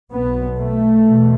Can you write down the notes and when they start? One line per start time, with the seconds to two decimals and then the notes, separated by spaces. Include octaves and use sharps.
0.11 B1 B2 B3
0.58 A3
1.05 E2 B2